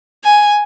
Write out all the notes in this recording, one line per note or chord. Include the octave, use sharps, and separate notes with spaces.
G#5